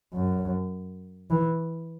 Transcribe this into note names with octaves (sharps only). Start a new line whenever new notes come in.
F#2
E3